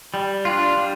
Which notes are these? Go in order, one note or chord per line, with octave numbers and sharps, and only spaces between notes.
G3
D4 F4
G3